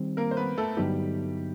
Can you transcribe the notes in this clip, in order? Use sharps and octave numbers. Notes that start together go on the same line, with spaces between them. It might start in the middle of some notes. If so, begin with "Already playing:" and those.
Already playing: D#3 G3 C4
A#3 A#4
C5
B3 B4
A3 A4
G2 D3 F#3 G3 B3 D#4 G4